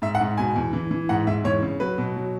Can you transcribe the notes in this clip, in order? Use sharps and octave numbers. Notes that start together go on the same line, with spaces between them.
G#2 E5
F#5
G#2
B2 G#5
E2
E3
E3
G#2 F#5
G#2 E5
E2 C#5
C#3
F#3 B4
B2
F#3